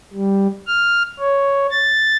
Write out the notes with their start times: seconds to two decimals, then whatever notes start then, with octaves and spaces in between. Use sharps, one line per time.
0.13 G3
0.67 F6
1.19 C#5
1.71 A6